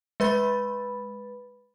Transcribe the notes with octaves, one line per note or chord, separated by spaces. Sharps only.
G#3 B4 B5 A6